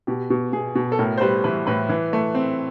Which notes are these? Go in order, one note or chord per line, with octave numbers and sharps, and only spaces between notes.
B2 G4
B2
B2 G#4
B2
A4
A2 A#4
C5
G3 B4
E3 B4
A2 B4
E3
A3
C4